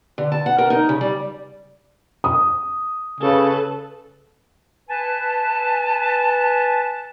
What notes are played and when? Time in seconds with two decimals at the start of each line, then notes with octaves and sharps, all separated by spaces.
0.18 D3
0.32 A5
0.46 F#5
0.58 A#4
0.70 D#4
0.89 C#3
1.01 G3
2.24 D#6
3.21 C#3 A4 B4
4.90 B4 G#5 A5